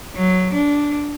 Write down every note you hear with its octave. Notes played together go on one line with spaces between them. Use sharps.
F#3
D4